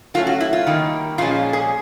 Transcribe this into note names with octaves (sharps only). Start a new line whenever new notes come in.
F#3 A3 C#4 F4
F#4
E4
F4
D#3 G3 A#3
A#2 F3 G#3 C#4 F4
G#4